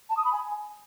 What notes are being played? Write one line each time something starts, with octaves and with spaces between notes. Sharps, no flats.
A5
D#6
B5
G#5